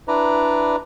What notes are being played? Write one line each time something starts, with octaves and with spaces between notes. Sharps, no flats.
D4 E4 B4 D5 A#5